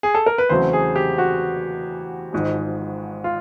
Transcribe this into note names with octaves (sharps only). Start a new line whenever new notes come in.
G#4
A4
A#4
B4
E2 C#3 F#3 A3 C4 C5
G#4
G4
F#4
G#1 G#2 F3 G#3
F4